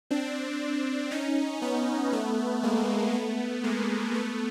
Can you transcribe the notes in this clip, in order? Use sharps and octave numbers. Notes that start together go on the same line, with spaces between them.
C4 D4
C#4 D#4
B3 C#4
A3 B3
G#3 A#3
A3 B3
G#3 A#3
A3 B3